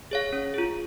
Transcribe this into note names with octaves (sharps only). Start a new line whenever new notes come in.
G#4 C#5 F5
C#4
F4 G#4